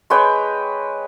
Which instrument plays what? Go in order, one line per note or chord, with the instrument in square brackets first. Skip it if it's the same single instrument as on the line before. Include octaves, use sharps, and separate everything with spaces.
[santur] G#3 B4 C#5 G5